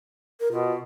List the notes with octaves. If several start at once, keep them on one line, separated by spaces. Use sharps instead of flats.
A#4
B2 F4